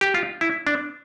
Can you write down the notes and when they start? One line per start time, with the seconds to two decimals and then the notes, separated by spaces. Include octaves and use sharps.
0.01 G4
0.14 F4
0.41 E4
0.67 D4